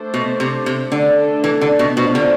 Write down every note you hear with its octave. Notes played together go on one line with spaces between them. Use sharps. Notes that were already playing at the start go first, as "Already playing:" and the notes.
Already playing: A3 D4 A4 C5
B2
C3
C3
D3 A3 D4 A4
E3
D3
B2
B2 A3 D4 F4 C5
D3